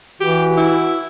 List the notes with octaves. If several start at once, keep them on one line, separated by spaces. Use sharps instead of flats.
E3 F#4 G4
E4